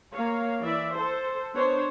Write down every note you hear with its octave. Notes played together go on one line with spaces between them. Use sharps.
A#3 C#5 F5
E3 D5 E5
A4 C5
B3 D4 C5 C#5